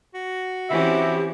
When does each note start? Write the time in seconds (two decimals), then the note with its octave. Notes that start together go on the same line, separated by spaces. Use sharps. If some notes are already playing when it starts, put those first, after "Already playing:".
0.14 F#4
0.69 C3 E3 C4 C#4 E4 G4 E5